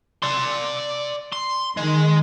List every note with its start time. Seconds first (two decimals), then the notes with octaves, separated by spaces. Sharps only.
0.23 D5 C6
1.32 C6
1.77 D#3 G#3